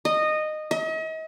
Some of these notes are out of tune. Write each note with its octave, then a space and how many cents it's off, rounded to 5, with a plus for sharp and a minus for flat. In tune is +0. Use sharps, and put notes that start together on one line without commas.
D#5 -15
D#5 +40